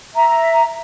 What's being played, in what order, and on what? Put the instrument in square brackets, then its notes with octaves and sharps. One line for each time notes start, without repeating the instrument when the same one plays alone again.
[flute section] E5 A#5